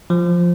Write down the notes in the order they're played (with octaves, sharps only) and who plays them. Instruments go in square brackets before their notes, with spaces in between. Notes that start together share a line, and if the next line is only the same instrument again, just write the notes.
[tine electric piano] F3